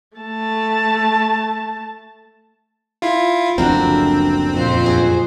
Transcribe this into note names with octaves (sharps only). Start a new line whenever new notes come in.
A3 A5
E4 F4
F#1 D2 F3 C4 D4 E4 F#4 A#4
F2 A#2 C5
F#4 G#4